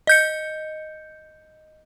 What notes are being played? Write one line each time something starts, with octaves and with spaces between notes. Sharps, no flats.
D#5 G6 C#7